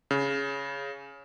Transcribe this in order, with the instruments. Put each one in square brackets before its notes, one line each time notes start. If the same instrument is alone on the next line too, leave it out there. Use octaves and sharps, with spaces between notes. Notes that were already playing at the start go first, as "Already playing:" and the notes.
[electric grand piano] C#3